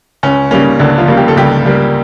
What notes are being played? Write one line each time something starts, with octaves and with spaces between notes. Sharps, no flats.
C#2 C#4
C#3 G3 A#3 C#4
C#2 D3 D4
F3 F4
C#3 G3 A#3
G4
A4
C#2 G3 G4
C#3 G3 A#3